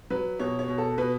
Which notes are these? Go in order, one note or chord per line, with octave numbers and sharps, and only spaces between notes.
F#3 B4
B2 C#5
C#5
B2
A4
B2 B4